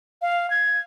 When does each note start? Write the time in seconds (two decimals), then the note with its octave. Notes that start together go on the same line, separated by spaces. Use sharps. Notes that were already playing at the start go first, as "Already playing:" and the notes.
0.22 F5
0.50 G#6